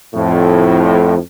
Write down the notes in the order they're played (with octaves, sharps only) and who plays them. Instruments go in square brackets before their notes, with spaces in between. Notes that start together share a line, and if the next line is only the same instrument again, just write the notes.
[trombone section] F2 A2